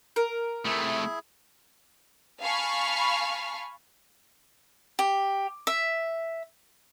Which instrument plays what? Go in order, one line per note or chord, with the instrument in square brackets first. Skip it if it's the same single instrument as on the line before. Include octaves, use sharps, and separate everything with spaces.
[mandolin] A#4
[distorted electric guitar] C3 A3 [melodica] E4 G#4 E5
[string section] F5 G#5 A5 B5 C#6 F6
[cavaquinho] G4
E5